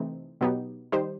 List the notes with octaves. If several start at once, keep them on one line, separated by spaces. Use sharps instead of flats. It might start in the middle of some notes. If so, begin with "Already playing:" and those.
Already playing: C3 E3 A3 C4 D#4
B2 F#3 B3 D#4 G4
D#3 G3 D#4 G4 C5